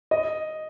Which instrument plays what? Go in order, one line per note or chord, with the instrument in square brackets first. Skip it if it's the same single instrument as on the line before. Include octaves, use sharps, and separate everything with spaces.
[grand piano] D#5